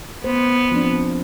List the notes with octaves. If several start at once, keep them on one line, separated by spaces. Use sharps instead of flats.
B3 C5
F3 C4 D4